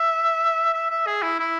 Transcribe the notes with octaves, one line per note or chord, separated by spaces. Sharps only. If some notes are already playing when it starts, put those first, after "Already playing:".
Already playing: E5
E5
E5
G#4
E4
E4